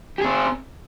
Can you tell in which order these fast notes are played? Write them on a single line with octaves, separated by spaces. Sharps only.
G4 G#4 C4